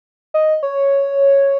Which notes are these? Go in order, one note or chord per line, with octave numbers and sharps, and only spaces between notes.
D#5
C#5